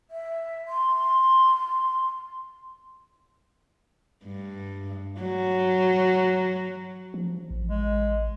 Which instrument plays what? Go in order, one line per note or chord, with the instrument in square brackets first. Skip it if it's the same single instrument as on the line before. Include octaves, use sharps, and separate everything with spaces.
[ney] E5
C6
[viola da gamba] G2
F#3
[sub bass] F3
A1
[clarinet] G#3